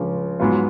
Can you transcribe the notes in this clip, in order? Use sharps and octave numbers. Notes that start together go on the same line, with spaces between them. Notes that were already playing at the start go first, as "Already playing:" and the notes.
Already playing: C#2 C#3 F3
G#2 F#3 B3 F4